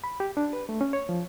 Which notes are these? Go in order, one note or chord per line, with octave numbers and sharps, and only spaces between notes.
B5
G4
D4
B4
A3
C#4
C#5
F3